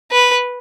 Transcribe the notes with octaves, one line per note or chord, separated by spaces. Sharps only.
B4